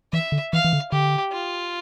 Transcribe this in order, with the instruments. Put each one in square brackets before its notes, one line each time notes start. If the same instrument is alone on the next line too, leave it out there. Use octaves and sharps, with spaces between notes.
[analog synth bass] E3 [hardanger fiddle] E5
[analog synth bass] D3
[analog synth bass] E3 [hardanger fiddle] F5
[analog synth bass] E3
D3
[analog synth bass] D3 [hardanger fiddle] G4
[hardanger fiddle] F4